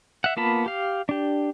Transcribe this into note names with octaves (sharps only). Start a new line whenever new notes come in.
E5 F#5
A#3 B3 F4 A5 B5
G4 F5
D4 G4